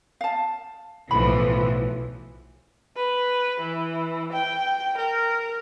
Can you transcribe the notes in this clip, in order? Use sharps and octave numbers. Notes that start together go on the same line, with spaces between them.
F5 A5
B1 A2 E3 F3 B5
B4
E3
G5
A#4